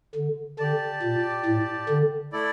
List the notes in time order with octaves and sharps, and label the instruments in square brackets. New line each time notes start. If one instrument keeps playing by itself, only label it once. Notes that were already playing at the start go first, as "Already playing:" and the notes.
[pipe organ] D3
[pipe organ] D3 [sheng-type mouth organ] G4 D5 A5
[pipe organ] A#2
A2
D3
[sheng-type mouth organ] A3 E4 A4 D5